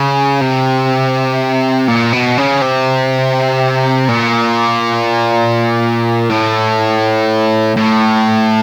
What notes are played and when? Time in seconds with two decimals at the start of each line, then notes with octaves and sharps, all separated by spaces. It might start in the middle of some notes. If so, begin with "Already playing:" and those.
Already playing: C#3
0.41 C3
1.88 A#2
2.12 B2
2.37 C#3
2.61 C3
4.09 A#2
6.29 A2
7.76 A2